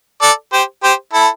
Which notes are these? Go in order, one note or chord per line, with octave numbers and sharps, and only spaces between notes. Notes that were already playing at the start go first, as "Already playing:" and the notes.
A4 D5
G4 C5
G4 C5
E4 A4